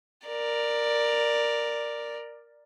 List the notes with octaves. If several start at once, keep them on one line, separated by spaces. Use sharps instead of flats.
A#4 D5